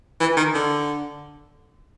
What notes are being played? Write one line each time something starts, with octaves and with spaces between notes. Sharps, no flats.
E3
D#3
D3